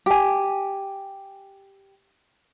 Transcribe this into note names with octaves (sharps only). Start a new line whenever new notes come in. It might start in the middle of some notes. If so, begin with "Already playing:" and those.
G4 G#5